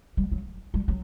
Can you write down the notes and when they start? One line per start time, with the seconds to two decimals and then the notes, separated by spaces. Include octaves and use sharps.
0.17 G3
0.32 F#3
0.74 G3
0.88 F#3